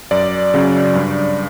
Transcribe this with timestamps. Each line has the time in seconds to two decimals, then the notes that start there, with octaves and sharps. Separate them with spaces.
0.11 F#2 D5
0.54 C#3 F#3 C#4
0.95 G2